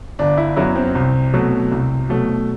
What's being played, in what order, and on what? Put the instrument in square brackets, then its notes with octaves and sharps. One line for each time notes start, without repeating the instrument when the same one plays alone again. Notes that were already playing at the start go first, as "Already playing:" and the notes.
[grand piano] G1 D4
E4
F#2 F#3 B3 E4
C4
C2
B2 F#3 A3
C2
B2 F#3 A3